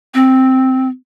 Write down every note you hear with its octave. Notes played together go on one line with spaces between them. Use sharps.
C4